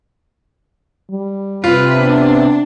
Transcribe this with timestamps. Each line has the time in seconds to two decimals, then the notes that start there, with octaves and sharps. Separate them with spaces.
1.11 G3
1.64 C3 C4 F4 B4
1.98 B3 D4